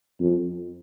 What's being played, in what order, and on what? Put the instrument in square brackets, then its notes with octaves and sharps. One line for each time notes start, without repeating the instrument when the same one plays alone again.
[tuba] F2